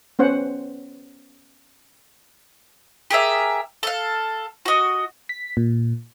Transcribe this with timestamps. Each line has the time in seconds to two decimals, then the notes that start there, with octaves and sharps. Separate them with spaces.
0.19 B3 C#4 C5 F#5
3.10 G4 G#4 A#4 E5
3.83 A4 F5
4.66 F#4 D#5
5.29 B6
5.57 A#2